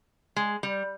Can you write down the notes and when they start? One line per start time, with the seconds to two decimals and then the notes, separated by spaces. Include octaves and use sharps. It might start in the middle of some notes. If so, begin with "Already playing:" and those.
0.36 G#3
0.63 G3